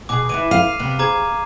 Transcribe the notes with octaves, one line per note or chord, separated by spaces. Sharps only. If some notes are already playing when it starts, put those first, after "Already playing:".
B2 G#4 D6
E3 B3 E4 D6 D#7
F5 D#7
C3 B3
G#4 C5 A#5 D6 G#6